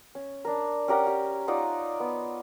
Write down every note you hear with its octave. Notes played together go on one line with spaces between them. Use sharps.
C#4
D4 A#4
C#4 G4 A#4 F#5
G4
D#4 F4 D5 F#5
B3